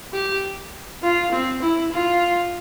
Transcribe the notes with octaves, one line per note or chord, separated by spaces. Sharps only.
G4
F4
C4
E4
F4